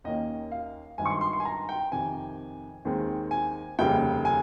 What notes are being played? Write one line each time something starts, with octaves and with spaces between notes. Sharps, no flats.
D#2 D#3 A#3 C#4 D#5
F5
G#1 G2 D#3 G#5
C#6
C6
C6
C6
G#5
A#5
G5
F2 C3 D#3 G#5
D#2 D#3 G#3 C4
G#5
F1 D#2 C#3 G3 A#3 G5
G#5